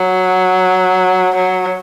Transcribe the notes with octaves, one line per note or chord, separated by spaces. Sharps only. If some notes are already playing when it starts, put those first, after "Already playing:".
Already playing: F#3
F#3